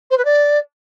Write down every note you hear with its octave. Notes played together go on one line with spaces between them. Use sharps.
C5
B4
D5